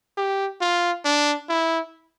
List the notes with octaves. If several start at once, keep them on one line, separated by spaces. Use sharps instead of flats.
G4
F4
D4
E4